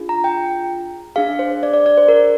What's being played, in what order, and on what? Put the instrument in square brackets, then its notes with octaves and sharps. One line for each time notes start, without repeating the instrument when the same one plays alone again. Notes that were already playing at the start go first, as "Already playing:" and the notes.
Already playing: [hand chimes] D4 F4 G#4
A#5
G5
D4 G#4 F5
C5
D5
D5
D5
C5
A#4